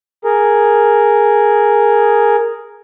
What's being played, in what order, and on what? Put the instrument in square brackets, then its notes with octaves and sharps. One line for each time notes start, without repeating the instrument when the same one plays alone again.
[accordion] G#4 A#4